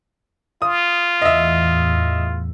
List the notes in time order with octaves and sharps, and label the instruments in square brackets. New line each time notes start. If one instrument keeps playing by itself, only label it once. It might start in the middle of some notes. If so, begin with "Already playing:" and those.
[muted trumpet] F4 [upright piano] D#6
[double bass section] E2 A2 [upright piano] D#5 E5